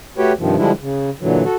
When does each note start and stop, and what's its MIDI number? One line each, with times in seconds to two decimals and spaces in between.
0.18 0.32 57
0.18 0.32 66
0.18 0.32 67
0.18 0.32 71
0.18 0.32 73
0.18 0.32 79
0.39 0.56 43
0.39 0.56 48
0.39 0.56 51
0.39 0.56 53
0.57 0.71 50
0.57 0.71 53
0.57 0.71 55
0.57 0.71 56
0.57 0.71 62
0.57 0.71 64
0.81 1.10 49
1.21 1.43 46
1.21 1.43 50
1.21 1.43 52
1.21 1.43 54
1.44 1.56 66
1.44 1.56 69